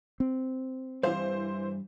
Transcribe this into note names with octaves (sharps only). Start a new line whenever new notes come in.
C4
G2 E3 C5 F5